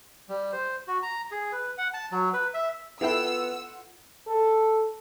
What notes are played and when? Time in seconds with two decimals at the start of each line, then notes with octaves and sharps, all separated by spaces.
0.29 G3
0.52 C5
0.87 F#4
1.03 A#5
1.31 G#4
1.52 B4
1.78 F#5
1.94 A5
2.12 F#3
2.33 B4
2.54 E5
3.01 B3 E4 F4 A4 F#5 G5 E6
4.28 A4